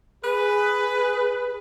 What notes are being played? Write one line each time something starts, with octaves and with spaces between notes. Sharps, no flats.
G#4 B4